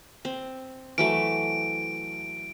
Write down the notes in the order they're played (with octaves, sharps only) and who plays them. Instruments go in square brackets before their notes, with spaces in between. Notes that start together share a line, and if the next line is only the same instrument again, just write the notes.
[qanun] C4
[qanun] E3 F#3 A3 [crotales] D7